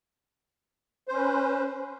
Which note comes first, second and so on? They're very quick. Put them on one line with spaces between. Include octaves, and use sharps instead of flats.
C5 C#4 B4